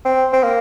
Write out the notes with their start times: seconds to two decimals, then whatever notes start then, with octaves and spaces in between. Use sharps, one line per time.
0.05 C4
0.33 C4
0.43 A#3